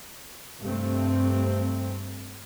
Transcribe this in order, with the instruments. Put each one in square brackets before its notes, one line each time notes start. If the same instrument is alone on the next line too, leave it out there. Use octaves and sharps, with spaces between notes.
[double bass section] G2 C3 A3 C4